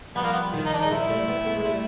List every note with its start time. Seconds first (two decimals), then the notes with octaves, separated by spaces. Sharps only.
0.15 F3 G3 B3
0.23 A#3
0.32 B3
0.53 D#3 F3
0.65 D#4
0.73 D4
0.81 D#4
0.85 G#3
0.90 F3 G3 E4
1.09 G3 A3
1.28 A3 B3
1.46 A3 B3
1.56 G#3
1.65 G3 A3